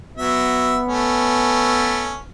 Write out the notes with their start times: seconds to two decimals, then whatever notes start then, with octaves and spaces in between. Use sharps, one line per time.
0.17 F#3 B3 E5
0.89 A3 C#4